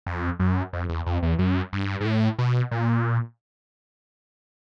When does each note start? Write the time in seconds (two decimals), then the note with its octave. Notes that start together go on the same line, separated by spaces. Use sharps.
0.07 F2
0.40 F#2
0.73 F2
0.89 E2
1.06 F2
1.22 E2
1.39 F#2
1.73 G2
2.01 G#2
2.05 A2
2.38 B2
2.71 A#2